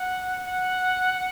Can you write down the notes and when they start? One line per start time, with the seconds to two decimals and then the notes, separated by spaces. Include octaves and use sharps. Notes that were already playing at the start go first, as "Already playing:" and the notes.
Already playing: F#5
0.43 F#5